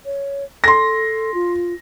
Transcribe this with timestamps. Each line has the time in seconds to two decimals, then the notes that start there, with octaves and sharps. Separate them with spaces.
0.05 C#5
0.64 A4 C6 A#6
1.34 F4